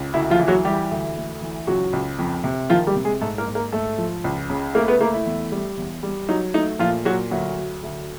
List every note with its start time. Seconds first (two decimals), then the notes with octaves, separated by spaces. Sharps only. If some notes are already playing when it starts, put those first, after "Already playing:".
Already playing: C#2
0.14 D2 E4
0.30 F3 F4
0.39 E3
0.48 F#3 F#4
0.65 E3 G3 G4
0.91 D2
1.17 A3
1.42 E3
1.67 C#2 F#3 F#4
1.93 C#2
2.19 F2
2.44 C3
2.70 D#3 F3 F4
2.87 G3 G4
2.96 C3
3.04 G#3 G#4
3.21 G#2 A3 A4
3.38 A#3 A#4
3.47 G#2
3.55 A#3 A#4
3.72 G#2 A3 A4
3.98 F3
4.24 C#2
4.50 C#3
4.75 A3 A#3 A#4
4.88 B3 B4
5.00 A3 A#3 A#4
5.14 E4
5.26 E2
5.52 G3
5.77 E2
6.03 G3
6.29 F#3 D#4
6.54 A3 D#4
6.79 A#2 F3 F4
7.05 A#2 F#3 F#4
7.31 D2 F#3 F#4
7.56 F#3
7.83 D2